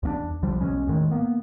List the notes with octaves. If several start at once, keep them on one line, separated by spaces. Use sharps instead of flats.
E2 A#3 D4
B1 D3 F3 G3
B1 E2 G#3 C#4
A2 D#3 G#3 A3
A#3 B3